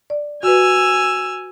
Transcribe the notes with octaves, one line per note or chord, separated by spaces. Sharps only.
D5
F#4 B4 G#5 E6 F6